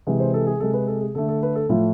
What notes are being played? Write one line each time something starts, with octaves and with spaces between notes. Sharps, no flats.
C3 E3 G#3
C5
A4
G#4
C3 G#3 A4
B4
A4
G#4
D3 A3 A4
A4
B4
A4
A2 F3 A3 F4